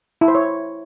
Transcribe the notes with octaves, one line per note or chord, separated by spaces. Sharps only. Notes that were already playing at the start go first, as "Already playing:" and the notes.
E4
C5
C#5